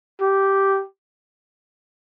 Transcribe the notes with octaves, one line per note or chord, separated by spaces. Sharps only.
G4